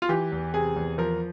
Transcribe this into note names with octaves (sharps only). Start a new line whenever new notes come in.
F4
E3 G4
E2
C3 G#4
E2
F3 A#4